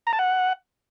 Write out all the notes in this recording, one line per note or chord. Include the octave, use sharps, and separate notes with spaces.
A#5
A5
F#5